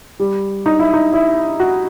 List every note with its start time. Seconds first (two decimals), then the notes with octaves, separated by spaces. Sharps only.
0.20 G3
0.66 D#4
0.79 E4
0.93 D#4
1.13 E4
1.60 F#4